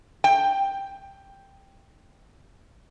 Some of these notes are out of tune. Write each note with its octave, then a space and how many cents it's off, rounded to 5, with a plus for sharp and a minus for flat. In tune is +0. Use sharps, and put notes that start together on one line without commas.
G5 +5